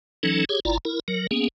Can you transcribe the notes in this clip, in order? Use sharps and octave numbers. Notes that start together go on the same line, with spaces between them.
E3 F#3 C#4 D#4 A4
G4 G#4 C#5
G1 E4 F4 D5 A#5
E4 A#4
F#3 A#4
A#3 B3 C#4 G#4